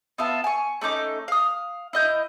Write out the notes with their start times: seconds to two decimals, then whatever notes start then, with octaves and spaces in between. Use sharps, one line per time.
0.18 B3 F4 E5 A5
0.44 G#5 C#6
0.81 A3 C#4 D#4 D6
1.28 F5 D#6
1.93 E4 D#5 G6